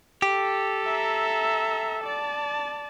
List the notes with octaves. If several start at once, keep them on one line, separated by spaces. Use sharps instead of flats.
G4 A4
E5 A#5
D5 A5